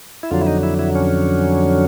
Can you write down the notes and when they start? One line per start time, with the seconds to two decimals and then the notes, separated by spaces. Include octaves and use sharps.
0.23 E4
0.31 F2 D3 F#3 F4
0.41 E4
0.47 D#4
0.63 E4
0.79 E4
0.95 C#4